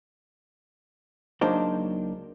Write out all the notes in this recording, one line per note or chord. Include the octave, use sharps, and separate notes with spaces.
C#2 F#3 A#3 D4 D#4 C5